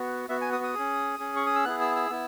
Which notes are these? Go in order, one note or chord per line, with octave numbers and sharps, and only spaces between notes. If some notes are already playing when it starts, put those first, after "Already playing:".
Already playing: B3 F#4
B3 F#4 E5
G#5
D#6
D#6
C#4 G#4
C#4 G#4
C#6
D#6
E6
B3 E4 G#4 F#6
E6
E6
B3 E4